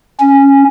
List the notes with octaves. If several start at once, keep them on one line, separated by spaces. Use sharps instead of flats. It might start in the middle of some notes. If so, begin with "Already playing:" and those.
C#4